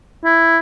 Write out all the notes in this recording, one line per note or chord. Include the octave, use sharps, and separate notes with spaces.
E4